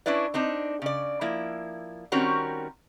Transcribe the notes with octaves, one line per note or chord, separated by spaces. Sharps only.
C#4 D4 E4 B4 D5
C4 D4 D#4
C#3 D5
F3 A#3 E4
D#3 G3 C4 C#4 F#4 A#4